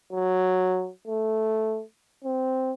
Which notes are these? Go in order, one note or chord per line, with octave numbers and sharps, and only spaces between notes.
F#3
A3
C4